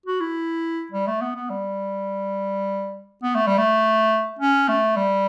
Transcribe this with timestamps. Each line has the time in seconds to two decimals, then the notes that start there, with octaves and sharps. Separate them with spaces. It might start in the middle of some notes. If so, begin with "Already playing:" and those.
0.06 F#4
0.20 E4
0.92 G3
1.07 A3
1.22 B3
1.35 B3
1.50 G3
3.23 B3
3.35 A3
3.47 G3
3.58 A3
4.39 C#4
4.68 A3
4.96 G3